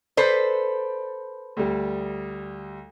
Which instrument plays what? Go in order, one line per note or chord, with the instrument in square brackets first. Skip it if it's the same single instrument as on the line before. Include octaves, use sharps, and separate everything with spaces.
[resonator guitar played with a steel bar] A4 B4 C5 [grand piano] D5 G6
[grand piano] D2 G3